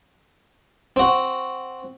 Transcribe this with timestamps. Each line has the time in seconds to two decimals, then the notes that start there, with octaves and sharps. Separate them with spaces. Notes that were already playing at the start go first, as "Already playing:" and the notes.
0.96 C4 F#4